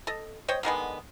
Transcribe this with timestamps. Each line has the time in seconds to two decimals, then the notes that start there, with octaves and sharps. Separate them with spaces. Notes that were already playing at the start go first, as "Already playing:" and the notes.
0.07 A4 D#5
0.48 C5 C#5 D#5 G5
0.63 D3 D#3 G#3 B3